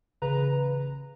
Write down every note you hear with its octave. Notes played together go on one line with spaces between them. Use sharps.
A1 C#3 B4 A#5